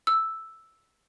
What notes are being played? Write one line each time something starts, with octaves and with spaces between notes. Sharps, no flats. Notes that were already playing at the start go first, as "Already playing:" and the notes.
E6